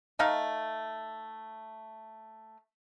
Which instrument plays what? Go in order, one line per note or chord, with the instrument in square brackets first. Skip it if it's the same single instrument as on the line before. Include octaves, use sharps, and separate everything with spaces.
[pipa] A3 D#4 F5